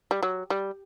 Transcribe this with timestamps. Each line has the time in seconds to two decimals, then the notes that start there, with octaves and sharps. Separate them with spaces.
0.11 G3
0.23 F#3
0.50 G3